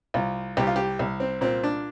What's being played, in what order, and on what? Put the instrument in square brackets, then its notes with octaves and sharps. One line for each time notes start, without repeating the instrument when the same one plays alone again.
[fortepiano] C2 F4
C2 G4
F4
G4
C2
C4
A#2 C4
D4